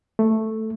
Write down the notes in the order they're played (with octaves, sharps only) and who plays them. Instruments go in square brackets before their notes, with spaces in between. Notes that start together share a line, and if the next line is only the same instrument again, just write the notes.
[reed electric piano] A3